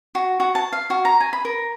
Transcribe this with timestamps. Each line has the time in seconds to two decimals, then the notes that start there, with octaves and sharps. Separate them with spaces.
0.15 F#4
0.40 F#4
0.55 A5
0.73 F5
0.90 F#4
1.05 A#5
1.20 G#5
1.33 B5
1.45 A#4